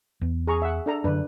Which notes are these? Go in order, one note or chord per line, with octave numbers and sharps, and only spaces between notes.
E2
G#4 A#5 C#6
E5 F#5
D4 A4 A#5
F#2 D3 D4 B4